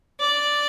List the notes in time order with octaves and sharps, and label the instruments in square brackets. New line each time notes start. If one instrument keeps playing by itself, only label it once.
[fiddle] D5